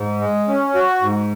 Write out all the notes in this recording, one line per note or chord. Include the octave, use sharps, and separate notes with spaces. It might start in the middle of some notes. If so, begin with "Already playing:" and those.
Already playing: G#2
G#3
C#4
F#4
G#2